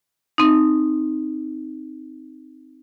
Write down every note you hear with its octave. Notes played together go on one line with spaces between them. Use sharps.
C4 D#4